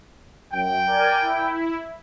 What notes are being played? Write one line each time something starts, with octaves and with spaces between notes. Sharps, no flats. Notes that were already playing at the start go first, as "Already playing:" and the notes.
F#2 G5
A#4 D5 G#5
E4